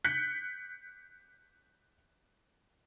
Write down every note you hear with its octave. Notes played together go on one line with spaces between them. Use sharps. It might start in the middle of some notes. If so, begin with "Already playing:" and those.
F#6 G6 B6 C#7